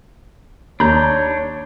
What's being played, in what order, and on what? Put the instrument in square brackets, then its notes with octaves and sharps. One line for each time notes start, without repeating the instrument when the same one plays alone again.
[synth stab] D#2 [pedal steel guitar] D4 G6 [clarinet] C#5 [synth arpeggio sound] A#5